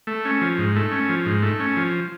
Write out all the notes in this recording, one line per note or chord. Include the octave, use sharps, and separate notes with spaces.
A3
C#4
F3
G#2
A3
C#4
F3
G#2
A3
C#4
F3